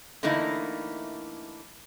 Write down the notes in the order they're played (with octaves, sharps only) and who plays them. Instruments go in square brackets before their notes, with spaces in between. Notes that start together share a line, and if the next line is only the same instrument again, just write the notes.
[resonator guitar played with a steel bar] D3 E3 A3 A#3 D#4 E4